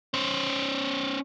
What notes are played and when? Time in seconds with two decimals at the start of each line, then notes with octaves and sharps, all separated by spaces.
0.14 C#4 C5